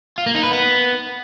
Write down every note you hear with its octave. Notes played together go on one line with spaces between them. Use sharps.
F4
A#3
D#4
B4
B3